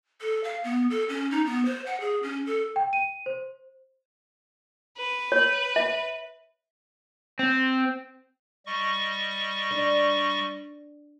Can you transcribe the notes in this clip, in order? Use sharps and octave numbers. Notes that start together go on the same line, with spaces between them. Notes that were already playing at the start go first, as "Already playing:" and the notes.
A4
F5
B3
A4
C#4
D#4
B3
C5
F#5
G#4
C#4
A4
G5
D#7
C5
B4
C#5
E5
C4
G3 D#5 C#6
D4